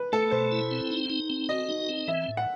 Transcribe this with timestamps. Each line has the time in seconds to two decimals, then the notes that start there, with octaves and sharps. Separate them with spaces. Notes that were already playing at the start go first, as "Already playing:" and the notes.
Already playing: B4
0.12 A3 A4
0.31 B2 C5
0.52 E4
0.71 C4
0.90 D#4
1.10 D#4
1.30 C4
1.49 F#4 D#5
1.69 D#4
1.89 C4
2.08 E3 E5
2.28 A2
2.37 F#5